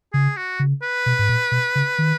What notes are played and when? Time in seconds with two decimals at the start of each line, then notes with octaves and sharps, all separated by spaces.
0.13 C#3 G#4
0.37 F#4
0.60 C#3
0.82 B4
1.06 B2
1.19 G#2
1.29 A#2
1.52 B2
1.75 C#3
1.98 D#3